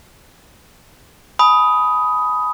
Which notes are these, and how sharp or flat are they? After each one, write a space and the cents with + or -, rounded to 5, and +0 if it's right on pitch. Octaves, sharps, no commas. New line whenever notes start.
G#5 +25 B5 +0 D#6 +10